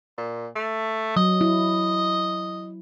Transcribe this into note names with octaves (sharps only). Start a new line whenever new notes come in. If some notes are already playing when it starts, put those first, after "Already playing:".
A#2
A3
F#3 D#5
E4